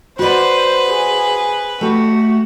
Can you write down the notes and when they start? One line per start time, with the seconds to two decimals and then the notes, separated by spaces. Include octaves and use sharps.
0.19 F#4 B4 C5 D5
0.88 G#4
1.81 A3 F#4 G4